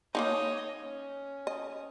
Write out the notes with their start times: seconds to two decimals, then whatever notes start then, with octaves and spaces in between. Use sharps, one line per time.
0.15 A#3 D4 D#4 C#5 D#5
0.82 C#4
1.47 D#5